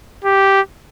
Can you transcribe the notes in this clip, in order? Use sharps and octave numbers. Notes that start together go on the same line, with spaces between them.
G4